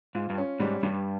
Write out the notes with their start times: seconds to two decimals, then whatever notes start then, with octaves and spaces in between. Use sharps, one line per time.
0.15 G#2 F4
0.30 G2
0.38 C#4
0.60 G#2 G3
0.83 G2 G3